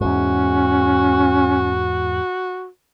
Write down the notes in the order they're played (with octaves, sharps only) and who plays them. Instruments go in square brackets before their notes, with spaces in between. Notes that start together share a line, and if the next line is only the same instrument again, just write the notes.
[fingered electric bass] E2 G#2 [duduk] C#4 [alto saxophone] F#4